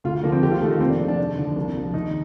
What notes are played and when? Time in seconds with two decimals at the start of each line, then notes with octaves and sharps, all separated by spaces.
0.04 D2 F4
0.23 D3 F3 A#3
0.32 C4
0.43 D#2 G4
0.51 F4
0.62 D#3 A3
0.71 A#3
0.80 F1 C4
0.90 D4
0.99 F2 C3 F3
1.08 D4
1.19 D#2
1.38 D3 F3
1.56 C2
1.75 A#2 F3
1.94 D#2 D#4